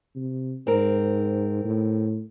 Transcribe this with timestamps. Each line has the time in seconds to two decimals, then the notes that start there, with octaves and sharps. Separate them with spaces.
0.15 C3
0.67 G#2 C4 A#4
1.64 A2